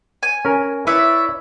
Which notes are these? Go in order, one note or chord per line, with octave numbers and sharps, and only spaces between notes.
G#5
C#4 A#4
E4 B4 C#5 D5 E5